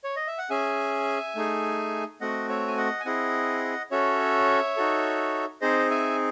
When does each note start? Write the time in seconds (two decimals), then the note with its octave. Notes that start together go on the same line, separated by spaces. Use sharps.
0.04 C#5
0.16 D#5
0.27 E5
0.38 F#5
0.50 C#4 G#4 E5 G#5
1.36 A3 D#4 G#4
2.21 A3 C4 F#4 D#5 F#5
2.49 C#5 E5
2.68 G#5
2.77 D#5 F#5
3.00 G#5
3.05 C4 E4 G#4 D#5 F#5
3.91 C#4 F#4 A4 C#5 E5
4.77 D#4 F#4 A4
5.61 C4 D#4 G#4 C5 D#5
5.90 E5 G#5